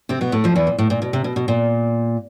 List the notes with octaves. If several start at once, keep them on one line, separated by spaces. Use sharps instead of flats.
C3 C4
B2 B3
A2 A3
F2 F3
E2 E3
A#2
A2
A#2
B2
C3
B2
B2
A#2